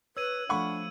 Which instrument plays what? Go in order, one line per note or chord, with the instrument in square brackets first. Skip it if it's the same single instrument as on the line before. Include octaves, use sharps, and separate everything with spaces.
[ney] B4 [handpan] C#5 [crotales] E6 G#6 D#7
[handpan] F3 A3 F5 [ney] D4 [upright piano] F#5 B5 C#6